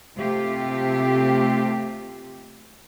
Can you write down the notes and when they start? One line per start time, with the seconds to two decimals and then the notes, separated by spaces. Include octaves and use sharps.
0.17 C3 A3 C4 F4 G4